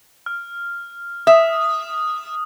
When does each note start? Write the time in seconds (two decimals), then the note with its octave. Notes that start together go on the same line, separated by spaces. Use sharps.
0.26 F6
1.27 E5 D#6